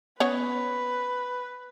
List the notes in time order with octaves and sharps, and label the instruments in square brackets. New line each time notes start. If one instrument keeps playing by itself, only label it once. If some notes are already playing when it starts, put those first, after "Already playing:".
[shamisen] B3 C#4 C#5 [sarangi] B4